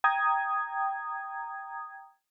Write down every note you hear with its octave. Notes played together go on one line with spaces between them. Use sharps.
G5 A#5 D#6 G#6